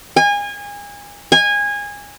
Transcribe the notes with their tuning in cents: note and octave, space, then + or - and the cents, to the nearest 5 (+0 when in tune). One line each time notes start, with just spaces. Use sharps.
G#5 -30
G#5 -20